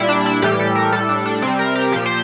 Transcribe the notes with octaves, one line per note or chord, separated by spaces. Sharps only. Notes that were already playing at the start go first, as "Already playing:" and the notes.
Already playing: A#2 G3 E4
D4
E4
A2 E3 G3 G4
A4
A#4
A2 G3 A4
D4
D4
C3 G3 C4
A#4
G4
A#2 F3 G4
C5